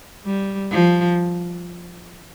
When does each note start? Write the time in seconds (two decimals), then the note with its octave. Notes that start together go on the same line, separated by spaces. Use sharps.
0.25 G3
0.72 F3